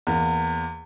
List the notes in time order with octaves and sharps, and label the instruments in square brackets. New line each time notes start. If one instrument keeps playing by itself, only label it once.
[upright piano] E2 A#3